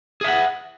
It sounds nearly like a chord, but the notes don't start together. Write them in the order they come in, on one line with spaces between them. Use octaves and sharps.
G#4 E5 F#5